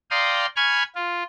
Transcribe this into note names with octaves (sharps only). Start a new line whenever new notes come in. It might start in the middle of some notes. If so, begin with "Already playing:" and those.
D5 F5 G5 A#5 C6 D#6
G#5 B5 C#6 F6 G#6
F4